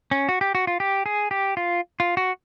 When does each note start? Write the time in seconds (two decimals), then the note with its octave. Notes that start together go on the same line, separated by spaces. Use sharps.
0.11 C#4
0.29 F#4
0.41 G4
0.55 F#4
0.67 F4
0.80 G4
1.06 G#4
1.31 G4
1.57 F4
2.00 F4
2.17 F#4